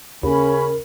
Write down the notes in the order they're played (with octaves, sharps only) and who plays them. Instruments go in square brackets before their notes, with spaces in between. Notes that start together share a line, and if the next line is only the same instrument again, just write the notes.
[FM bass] D#2 [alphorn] C#3 [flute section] C#4 B5 [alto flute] A#4